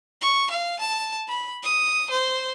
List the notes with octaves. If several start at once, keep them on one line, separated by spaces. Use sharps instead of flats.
C#6
F5
A5
B5
D#6
C5